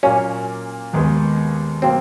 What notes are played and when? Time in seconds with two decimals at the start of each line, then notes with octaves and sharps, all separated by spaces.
0.03 A#2 F#3 A#3 C#4
0.93 D#2 D#3 G#3 B3
1.82 B2 F#3 A#3 C4